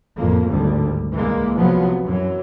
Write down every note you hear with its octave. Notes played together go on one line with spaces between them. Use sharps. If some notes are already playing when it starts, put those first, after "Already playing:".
A1 F2 A#3
G#1 D2 G3
C2 E3 G#3 A#3
C3 F3 F#3 B3
F#2 E3 F#3